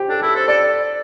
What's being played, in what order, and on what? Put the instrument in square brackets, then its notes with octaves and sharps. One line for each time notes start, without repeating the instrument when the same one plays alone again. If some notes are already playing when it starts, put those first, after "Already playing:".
Already playing: [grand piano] G4 C5
[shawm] D4 [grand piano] A4
[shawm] E4 [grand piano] A4
[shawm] A4 [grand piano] C5
[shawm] A4 [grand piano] D5